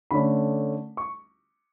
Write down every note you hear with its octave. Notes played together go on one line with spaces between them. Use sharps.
D3 A3 C#4 B5
C#6